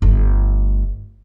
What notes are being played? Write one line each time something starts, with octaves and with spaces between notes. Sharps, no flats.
G1 A3